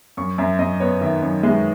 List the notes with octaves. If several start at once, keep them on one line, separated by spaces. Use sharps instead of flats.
F#2 C#6
F#2 E5
F#2 D#5
B3 C#5
D#3 E5
F#2
G#3 E5